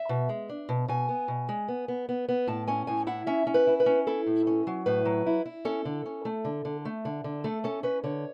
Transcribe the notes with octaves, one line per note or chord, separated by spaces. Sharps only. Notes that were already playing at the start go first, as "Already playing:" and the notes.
Already playing: E5
B2
G#3
D4
B2
B2 G#5
B3
B2
G#3
B3
B3
B3
B3
A2 A5
C#4 G#5
A2 G#5
E4 F#5
C#4 E5
C#4
B4
E4
B4
C#4
E4 A4
A2
C#4
F#3
A2 B4
F#3
E4
E4
C#4 A4
D3
C#4
A3
D3
D3
A3
D3
D3
A3 A4
C#4 A4
C#4 B4
D3 C#5